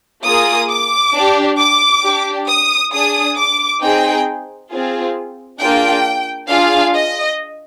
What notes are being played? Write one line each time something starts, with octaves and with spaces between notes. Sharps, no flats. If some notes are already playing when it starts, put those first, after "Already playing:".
A#3 F4 G#4 D#6
D6
D4 G4
D6
D4 G4
D#6
D4 G#4 D#6
D6
C4 D#4 G#4 G5
C4 F4 G#4
A#3 D4 F4 G#4 G5
D4 F4 G#4 F5
D#5